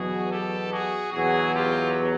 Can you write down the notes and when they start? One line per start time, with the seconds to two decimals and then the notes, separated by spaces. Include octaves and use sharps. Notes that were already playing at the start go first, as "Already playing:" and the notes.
Already playing: E2 B2 F#3 F#4 G#4
0.30 G4 A4
0.71 F#4 G#4
1.12 E2 B2 F#3 F#4 G#4
1.53 F4 G4